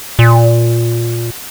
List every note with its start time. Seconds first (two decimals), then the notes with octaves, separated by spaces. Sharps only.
0.19 A#2